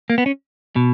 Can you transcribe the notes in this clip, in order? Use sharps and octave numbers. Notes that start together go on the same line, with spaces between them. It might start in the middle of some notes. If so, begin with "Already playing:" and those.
A#3
B3
C#4
B2